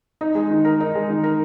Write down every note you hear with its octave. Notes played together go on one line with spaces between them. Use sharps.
D#4
G#3
D#3
A#4
D#4
G#3
D#3
A#4